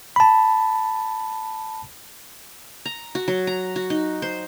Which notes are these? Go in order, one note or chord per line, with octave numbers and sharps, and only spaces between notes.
A5 B5
A#5
F#4
F#3
A#5
F#4
D#4
C5